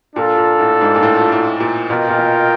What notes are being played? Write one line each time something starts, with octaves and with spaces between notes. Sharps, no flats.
A#2 D4 F4 A4
A#2
A2
G#2
A#2
A2
A2
A#2
B2 F4 A#4 D#5 G5
A#2
B2